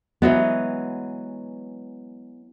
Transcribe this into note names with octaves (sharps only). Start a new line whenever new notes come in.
E3 F#3 G#3 B3